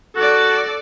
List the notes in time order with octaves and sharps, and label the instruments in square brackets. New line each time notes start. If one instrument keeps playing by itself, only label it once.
[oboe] F#4 [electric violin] A4 D5